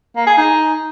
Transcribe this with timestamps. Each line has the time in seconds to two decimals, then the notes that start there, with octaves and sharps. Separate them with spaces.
0.17 A#3
0.27 G#4
0.37 D#4